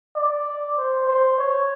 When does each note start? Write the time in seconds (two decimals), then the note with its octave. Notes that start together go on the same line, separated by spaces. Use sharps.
0.16 D5
0.77 C5
1.08 C5
1.38 C#5